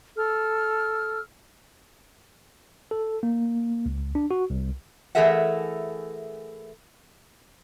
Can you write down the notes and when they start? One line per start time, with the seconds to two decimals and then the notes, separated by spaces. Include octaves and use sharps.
0.16 A4 E6 F6
2.91 A4
3.23 A#3
3.86 C#2
4.15 D4
4.31 F#4
4.50 C2
5.15 E3 A3 G#4 A#4 E5 F#5